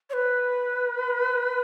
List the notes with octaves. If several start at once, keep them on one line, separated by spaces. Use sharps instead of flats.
C#5
B4